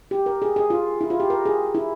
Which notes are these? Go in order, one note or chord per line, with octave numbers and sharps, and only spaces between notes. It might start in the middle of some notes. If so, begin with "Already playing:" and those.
G4
A#4
G#4
G#4
F4
E4
F4
G4
A#4
G#4
E4